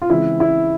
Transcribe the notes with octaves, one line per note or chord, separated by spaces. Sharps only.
F4
C#3 E3 G#3 C4 E4
E4